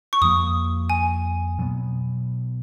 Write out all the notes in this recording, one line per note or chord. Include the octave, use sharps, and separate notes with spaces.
C#6
F2 F3 A#3 D#6
G#5
B2 F#3 B3